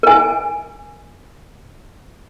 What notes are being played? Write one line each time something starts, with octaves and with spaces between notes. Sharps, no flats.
A#4 G#5